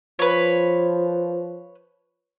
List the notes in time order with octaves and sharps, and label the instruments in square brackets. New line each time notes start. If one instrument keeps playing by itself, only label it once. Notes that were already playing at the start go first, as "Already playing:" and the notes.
[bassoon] F3 [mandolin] B4 C#5